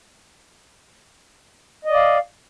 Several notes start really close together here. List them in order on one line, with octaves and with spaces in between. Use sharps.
D#5 D5 F5